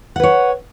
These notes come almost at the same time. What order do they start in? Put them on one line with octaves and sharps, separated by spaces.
F#5 B4 C#5